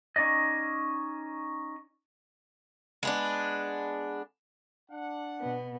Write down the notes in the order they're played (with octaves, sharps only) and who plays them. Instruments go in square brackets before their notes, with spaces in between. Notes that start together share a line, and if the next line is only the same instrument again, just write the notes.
[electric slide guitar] C#4 D#4 D5 D#5
[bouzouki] G#3 B3 D4
[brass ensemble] D4 F#5
[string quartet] B2 B3